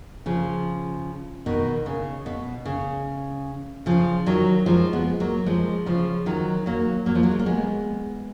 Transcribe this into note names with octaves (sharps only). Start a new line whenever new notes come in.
C#3 F3
B2 D#3
C#3
B2
C#3
C#3 F3
D#3 F#3
F3 G#3
G#3 B3
F#3 A#3
F3 G#3
C#3 F3
D#3 F#3
F#3 A#3
F#3 A#3
F3
F#3
G#3
A#3
G#3 B3